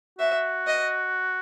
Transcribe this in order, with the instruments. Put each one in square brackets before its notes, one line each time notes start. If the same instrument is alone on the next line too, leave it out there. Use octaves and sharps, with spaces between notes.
[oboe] F#4 [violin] E5
[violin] D#5